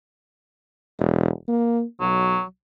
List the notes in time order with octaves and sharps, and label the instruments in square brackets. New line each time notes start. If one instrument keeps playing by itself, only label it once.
[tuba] E1
A#3
[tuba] B1 [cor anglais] F#3